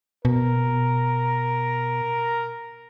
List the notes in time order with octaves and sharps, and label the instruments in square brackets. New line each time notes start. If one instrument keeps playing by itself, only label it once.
[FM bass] B2 [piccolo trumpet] A#4